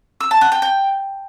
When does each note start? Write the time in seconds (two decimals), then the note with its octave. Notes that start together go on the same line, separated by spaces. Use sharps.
0.21 E6
0.31 A5
0.41 F#5
0.52 G5
0.62 G5